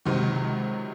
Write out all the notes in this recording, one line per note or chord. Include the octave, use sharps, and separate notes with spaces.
C#2 C3 D#3 F#3